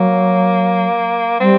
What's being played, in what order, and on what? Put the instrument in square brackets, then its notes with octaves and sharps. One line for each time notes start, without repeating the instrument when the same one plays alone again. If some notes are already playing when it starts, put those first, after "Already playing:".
Already playing: [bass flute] F#3 [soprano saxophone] A#3
[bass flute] G3 [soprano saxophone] C4